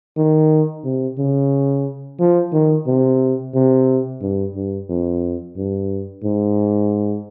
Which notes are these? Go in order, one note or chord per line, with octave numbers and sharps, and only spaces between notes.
D#3
C3
C#3
F3
D#3
C3
C3
G2
G2
F2
G2
G#2